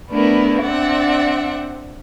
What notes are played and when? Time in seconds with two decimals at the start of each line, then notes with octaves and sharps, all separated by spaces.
0.11 A3 B3 D4 E4 A#4
0.62 C4 D4 D5 E5 F#5